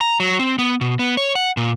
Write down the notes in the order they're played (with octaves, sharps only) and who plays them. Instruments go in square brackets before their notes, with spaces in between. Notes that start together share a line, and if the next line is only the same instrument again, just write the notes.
[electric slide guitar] A#5
F#3
C4
B3
B2
B3
C#5
F#5
A#2